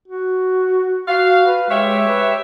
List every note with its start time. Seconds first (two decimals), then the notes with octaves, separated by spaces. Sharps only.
0.08 F#4
1.08 F#4 F5
1.46 B4
1.70 G#3 G4 C#5 E5
2.08 B4